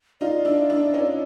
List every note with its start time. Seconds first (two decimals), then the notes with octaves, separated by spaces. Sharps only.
0.21 D#4 F4 D5
0.45 D4 E4
0.70 D4 E4
0.94 C#4 D#4